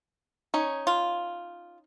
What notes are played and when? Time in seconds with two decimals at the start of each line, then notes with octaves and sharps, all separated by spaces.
0.54 C#4 D#4 C#5
0.87 F4